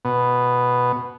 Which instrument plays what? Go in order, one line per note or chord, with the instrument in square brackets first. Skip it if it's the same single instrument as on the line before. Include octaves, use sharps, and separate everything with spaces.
[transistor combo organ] B2